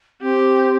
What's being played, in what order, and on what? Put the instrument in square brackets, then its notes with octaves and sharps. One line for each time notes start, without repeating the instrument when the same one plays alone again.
[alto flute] C4 [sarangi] G4